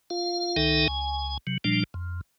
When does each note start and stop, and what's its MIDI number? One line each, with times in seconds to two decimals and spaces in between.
0.10 0.56 65
0.10 0.56 77
0.56 0.88 37
0.56 0.88 51
0.56 0.88 63
0.56 0.88 69
0.56 0.88 76
0.56 0.88 79
0.88 1.37 37
0.88 1.37 80
1.47 1.58 48
1.47 1.58 54
1.64 1.83 46
1.64 1.83 53
1.64 1.83 55
1.64 1.83 62
1.94 2.21 41